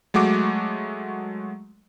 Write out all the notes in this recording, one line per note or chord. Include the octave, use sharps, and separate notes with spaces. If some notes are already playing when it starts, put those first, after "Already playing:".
F#3 G#3 A3 F#4 D6